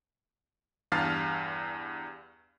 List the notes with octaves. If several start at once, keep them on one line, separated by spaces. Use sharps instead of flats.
E2 G2 F5 A5 F6 A6